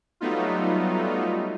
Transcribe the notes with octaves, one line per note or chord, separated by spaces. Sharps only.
F#3 G3 A3 B3 D#4 F4